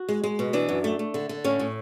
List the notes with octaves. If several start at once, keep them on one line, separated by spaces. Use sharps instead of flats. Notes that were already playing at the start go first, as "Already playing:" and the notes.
Already playing: F#4
G#3
G#3
B2
E3 D4
F#2
A3
A3
D3
D3
A2 C#4
A2